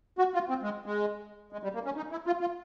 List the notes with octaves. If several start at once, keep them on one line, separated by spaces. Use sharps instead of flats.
F#4
F4
C4
G#3
G#3
G#3
G3
A#3
C#4
D#4
E4
F4
F4